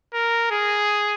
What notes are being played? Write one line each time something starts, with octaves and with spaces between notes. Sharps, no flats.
A#4
G#4